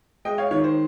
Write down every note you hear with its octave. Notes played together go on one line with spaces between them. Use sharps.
G#3 D#5 G5
C#5 F5
D#3 C#5
C5